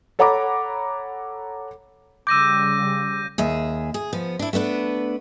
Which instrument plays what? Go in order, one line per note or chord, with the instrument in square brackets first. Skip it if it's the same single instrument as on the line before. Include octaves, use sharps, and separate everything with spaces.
[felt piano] A4 C#5 F#5 A#5 B5 D6
[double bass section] C#3 G3 [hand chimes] D6 E6 [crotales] G6 A#6 D#7
[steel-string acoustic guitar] D#2 G#4 E5
G#4
F3 B3
D4 E4
A3 B3 D4 B4